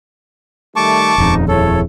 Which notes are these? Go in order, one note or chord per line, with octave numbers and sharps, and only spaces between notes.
D#3 G3 A3 A5 C#6 D6
D#1 F2 G#2 C#3 D#4
E4 G#4 A4 C#5